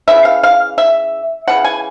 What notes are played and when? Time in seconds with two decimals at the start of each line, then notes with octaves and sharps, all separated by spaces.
0.08 C#3 E3 E5
0.25 F5
0.43 F5
0.78 E5
1.48 C#3 E3 F#5
1.64 G#5